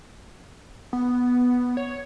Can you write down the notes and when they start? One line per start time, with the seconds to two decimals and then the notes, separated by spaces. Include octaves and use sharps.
0.93 B3
1.77 C#5